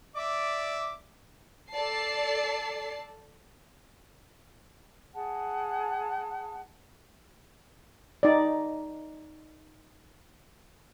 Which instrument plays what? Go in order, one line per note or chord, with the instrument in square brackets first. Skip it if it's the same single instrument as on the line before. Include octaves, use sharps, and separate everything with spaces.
[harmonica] D5 E5 D6
[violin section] A4 D5 A5 C7
[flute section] G#4 F#5 A5
[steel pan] D#4 D5